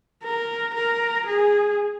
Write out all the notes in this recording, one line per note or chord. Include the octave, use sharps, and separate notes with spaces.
A#4
A#4
G#4